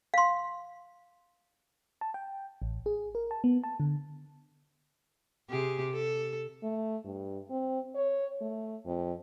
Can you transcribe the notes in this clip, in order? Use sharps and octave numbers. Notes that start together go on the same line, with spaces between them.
F5 C6
A5
G5
A1
G#4
A#4
A5
B3
A5
D3
C3 G4 G#4
A4
A3
G2
C4
C#5
A3
F2